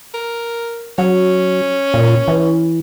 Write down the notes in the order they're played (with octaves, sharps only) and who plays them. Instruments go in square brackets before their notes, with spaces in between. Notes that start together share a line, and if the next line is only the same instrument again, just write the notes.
[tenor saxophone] A#4
[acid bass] F#3 [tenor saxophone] C#4
[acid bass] A#2
E3